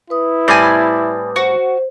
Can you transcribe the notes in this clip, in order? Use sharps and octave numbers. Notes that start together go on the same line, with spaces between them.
E4 B4 D#6
A2 G3 C4 D5 G#5
F#4 C5